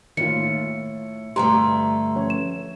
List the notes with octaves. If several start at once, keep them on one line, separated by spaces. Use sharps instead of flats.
A2 D#3 A#3 F4 C#7
G2 D3 A3 G4 A#5 C6
F3 C#4 C#5
E7